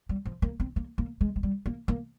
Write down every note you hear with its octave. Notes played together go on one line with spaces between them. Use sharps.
G3
F3
A#3
C4
A#3
A#3
G#3
G#3
G3
A#3
A#3